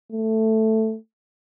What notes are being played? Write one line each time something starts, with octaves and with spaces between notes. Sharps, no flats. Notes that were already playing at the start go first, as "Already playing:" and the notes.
A3